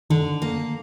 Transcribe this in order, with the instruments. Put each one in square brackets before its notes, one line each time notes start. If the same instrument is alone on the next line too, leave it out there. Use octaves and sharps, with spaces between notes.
[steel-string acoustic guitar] D3 [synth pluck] D#3
[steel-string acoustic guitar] A#3